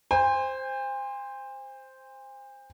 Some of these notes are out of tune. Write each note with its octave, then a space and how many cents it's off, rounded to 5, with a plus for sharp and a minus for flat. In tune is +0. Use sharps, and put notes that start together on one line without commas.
C5 +0 G#5 -45